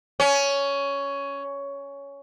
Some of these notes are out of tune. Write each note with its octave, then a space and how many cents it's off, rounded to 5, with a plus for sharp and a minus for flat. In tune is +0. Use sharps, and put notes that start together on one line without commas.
C#4 +10